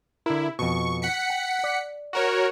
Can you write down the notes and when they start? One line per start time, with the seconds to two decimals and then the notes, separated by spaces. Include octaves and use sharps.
0.26 D3 E4 A#4
0.59 F2 B2 C#6
1.02 F#5 B6 C#7
1.30 G5
1.64 D5
2.13 F#4 A#4 C#5